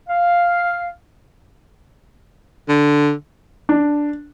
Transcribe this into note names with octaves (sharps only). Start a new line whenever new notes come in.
F5
D3
D4